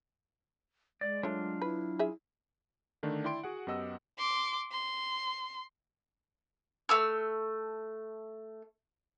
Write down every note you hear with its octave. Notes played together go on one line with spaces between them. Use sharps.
G#3 D5
F#3 A3 D4 F4 C#5
E4 B4
G#4 E5
D3 D#3 A3 D4
E4 D5 G5 C6 D7
F#4 G#4 F#5
F#2 B3 G4 D#5 F#5 E6
C6 D6
C6
A3 E6 F6